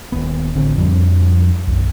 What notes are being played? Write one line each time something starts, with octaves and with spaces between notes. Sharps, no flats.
D#1 B3
A1 D3 C4
F2 F3 G3 D4
B1 F#2